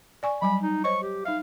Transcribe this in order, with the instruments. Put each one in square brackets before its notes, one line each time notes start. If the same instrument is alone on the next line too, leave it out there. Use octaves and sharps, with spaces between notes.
[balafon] D5 G#5 C#6
[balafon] F#3 G3 G#5 [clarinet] B5
[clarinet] D#4
[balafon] C5 C#5 D#5 [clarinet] C#6
[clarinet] G4
[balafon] D#4 E5 [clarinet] F5